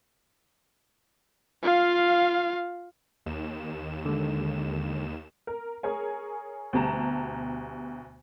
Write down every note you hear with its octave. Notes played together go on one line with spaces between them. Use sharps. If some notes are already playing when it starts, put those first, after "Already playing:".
F4 F5
D#2 E7
D3 G#3
A#4
G#4 A#4 C#5 G#5
D2 B2 G3 A5 A#5 E7